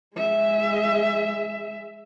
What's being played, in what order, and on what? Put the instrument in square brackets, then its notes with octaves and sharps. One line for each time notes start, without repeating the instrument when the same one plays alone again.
[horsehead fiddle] G#3 E5